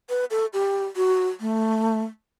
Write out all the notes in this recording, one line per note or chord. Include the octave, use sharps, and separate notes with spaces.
B4
A4
G4
F#4
A3